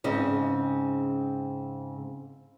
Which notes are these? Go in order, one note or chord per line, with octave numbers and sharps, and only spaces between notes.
G#2 C#3 C4 D#5